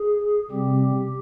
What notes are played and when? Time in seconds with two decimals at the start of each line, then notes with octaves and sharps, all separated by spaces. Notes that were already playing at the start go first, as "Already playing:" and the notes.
Already playing: G#4
0.51 C3 G3 C4 G4